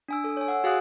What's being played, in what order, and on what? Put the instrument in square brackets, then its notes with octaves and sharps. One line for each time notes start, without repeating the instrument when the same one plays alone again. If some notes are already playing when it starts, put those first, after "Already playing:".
[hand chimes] D4 G#5 E6
A4
C#5 G#5
F#5 E6
F#4 G#4 F5 G#5 D#6 F#6